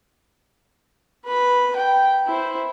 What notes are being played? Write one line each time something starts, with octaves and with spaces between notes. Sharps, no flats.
B4 B5
G5
E4 C5